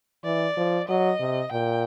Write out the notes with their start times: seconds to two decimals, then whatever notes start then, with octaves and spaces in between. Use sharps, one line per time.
0.24 E3 D5
0.57 F3
0.88 F#3 D#5
1.20 C3
1.52 A#2 G5